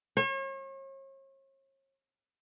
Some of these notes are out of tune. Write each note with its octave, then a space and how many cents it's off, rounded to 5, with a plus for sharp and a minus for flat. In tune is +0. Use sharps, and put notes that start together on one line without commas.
C#5 -40